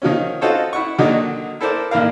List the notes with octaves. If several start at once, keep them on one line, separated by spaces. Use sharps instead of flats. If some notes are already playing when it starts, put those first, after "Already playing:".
D#3 F3 F#3 C#4
D#4 F4 F#4 A4 C5 C#5
E4 F#5 C#6
A#2 D3 D#3 F#3 D4 D#4
E4 A4 A#4 C5 D5
A1 D#2 E4 A#4 F5